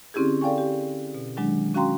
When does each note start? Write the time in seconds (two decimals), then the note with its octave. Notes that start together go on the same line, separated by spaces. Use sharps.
0.14 D3 C4 C#4 E4 G4 G#4
0.41 A4 D5 F5 G5 G#5 C#6
0.58 G4
1.15 B2
1.37 D#3 F#3 G#3 D4
1.75 C#4 F#4 F5 G5 A#5 C6